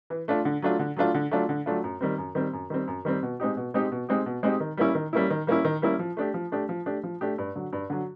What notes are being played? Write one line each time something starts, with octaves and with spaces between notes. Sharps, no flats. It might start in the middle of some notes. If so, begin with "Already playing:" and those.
E3
A3 D4 F4
D3
F#3 A3 D4 F4
D3
F#3 A3 D4 F4
D3
F#3 A3 D4 F4
D3
F#3 A3 D4 F4
F#2
D#3 G3 C4
F#2
D#3 G3 C4
F#2
D#3 G3 C4
F#2
D#3 G3 C4
B2
G#3 C4 D#4 G4
B2
G#3 C4 D#4 G4
B2
G#3 C4 D#4 G4
B2
G#3 C4 D#4 G4
D#3
G3 A#3 C#4 E4
D#3
G3 A#3 C#4 E4
D#3
G3 A#3 C#4 E4
D#3
G3 A#3 C#4 E4
F3
A3 D4 G4
F3
A3 D4 G4
F3
A3 D4 G4
F3
A3 D4 G4
G2
D3 F#3
G2
D3 F#3